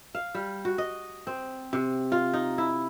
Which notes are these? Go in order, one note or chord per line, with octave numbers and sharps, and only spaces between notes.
F5
G3
F#4
D#5
C4
C3
F4
D#4
E4